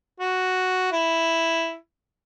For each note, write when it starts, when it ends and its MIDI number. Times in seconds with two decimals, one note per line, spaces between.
0.20 0.89 66
0.92 1.75 64